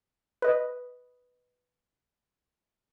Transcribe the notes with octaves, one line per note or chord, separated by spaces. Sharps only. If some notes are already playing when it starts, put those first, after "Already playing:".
B4 D#5